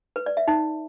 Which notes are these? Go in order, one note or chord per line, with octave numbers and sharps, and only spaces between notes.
B4
D5
E5
D#4